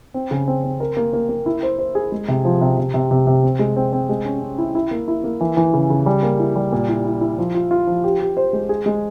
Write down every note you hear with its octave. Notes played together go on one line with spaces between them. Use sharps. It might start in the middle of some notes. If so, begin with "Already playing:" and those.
C4
C#3
C4
C4
A#4
A#3
A#3
A#3
E4
C5
C5
G#4
G#3
C3
F3
C3
C3
C3
C3
C3
C4
G#3
C4
C4
G#3
C#4
C#4
E4
E4
A#3
E4
A#3
E3
E3
C#3
C#3
G3
A#3
E4
G3
A#2
E4
E4
E4
F3
F4
F4
F3
G4
G4
C5
G#3
G#4
G#3